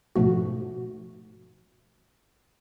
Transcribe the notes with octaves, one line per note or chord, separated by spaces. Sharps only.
G#2 B2 F3 A3 F#4